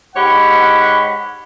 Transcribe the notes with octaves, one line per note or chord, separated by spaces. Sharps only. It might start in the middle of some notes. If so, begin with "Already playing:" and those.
G#2 G4 C#5 F#5 B5